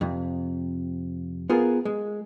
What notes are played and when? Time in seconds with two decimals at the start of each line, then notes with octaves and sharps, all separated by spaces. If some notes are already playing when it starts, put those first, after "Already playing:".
0.01 F2 C3
1.50 B3 F4 G#4 A#4
1.85 G#3